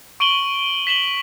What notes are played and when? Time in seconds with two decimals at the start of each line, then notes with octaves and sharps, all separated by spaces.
0.20 C#6 D7 D#7 F#7 G7
0.87 B6 E7 F#7 G7